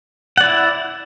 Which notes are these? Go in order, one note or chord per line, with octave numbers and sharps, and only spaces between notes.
E4 D5 F#5